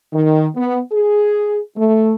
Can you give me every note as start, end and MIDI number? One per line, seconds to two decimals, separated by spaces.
0.12 0.46 51
0.55 0.78 59
0.91 1.58 68
1.77 2.13 57